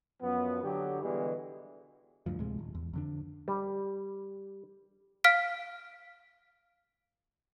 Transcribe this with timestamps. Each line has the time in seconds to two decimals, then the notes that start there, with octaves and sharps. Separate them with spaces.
0.23 F#2 F3 B3
0.63 D3 F#3 G4
1.02 B2 D3 E3 G3 G#3 B3
2.26 D2 G2 F3
2.39 D2 A2 C3 G#3
2.59 D#1
2.75 E2
2.93 F2 D3 D4
3.48 G3
5.24 F5 F6 B6 D7